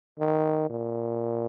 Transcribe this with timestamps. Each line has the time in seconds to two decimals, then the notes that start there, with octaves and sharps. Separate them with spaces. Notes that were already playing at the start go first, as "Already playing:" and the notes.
0.19 D#3
0.70 A#2